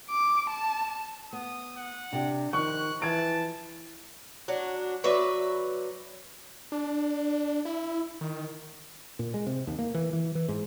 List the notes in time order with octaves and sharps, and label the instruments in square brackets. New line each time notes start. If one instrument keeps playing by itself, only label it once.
[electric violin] D6
A5
[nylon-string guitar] B3 [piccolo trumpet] D#6
[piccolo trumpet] F#5
[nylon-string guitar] C3 G4 [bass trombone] D4
[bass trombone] D#3 [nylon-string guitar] F3 [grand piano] C#6 [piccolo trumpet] F#6
[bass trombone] E3 [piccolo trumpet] A5 [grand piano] G#6 D7
[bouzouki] F#3 D4
F#3 B4 D5 E5
[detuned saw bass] D4
E4
D#3
[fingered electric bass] A#2
G#3
C3
D#2
A#3
E3
E3
E3
G#2